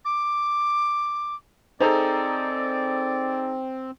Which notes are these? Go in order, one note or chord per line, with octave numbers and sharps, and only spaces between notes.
D6
C4 D#4 G#4 A4 C5 D5 A#5